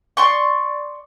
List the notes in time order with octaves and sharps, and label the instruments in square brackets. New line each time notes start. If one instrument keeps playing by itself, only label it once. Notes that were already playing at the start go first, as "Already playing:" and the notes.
[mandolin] D5 C6 C#6